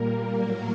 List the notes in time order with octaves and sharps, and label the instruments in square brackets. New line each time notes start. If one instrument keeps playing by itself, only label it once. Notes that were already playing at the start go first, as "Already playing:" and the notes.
Already playing: [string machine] A#2 G3 A#3 A#4
A2 F#3 A#3 A#4